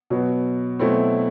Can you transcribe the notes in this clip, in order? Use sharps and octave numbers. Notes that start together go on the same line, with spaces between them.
B2 F#3 B3
B2 F#3 A3 C4 E4